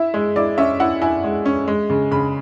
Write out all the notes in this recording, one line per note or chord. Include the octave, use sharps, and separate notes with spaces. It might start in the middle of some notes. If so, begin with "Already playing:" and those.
Already playing: E4 E5
G#3
E4 D5
C#4 E5
E4 F#5
E4 G#5
G#3
C#4
G#3
C#3
C#3 B5